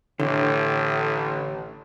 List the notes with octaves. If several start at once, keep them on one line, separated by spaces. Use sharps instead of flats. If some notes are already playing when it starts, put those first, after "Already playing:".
A1 A2 D3